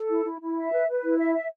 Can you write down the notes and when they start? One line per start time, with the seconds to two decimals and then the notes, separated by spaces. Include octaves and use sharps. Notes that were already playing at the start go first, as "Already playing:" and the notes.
Already playing: A4
0.09 E4
0.25 E4
0.40 E4
0.56 E5
0.72 B4
0.87 B4
1.03 E4
1.18 E5
1.33 E5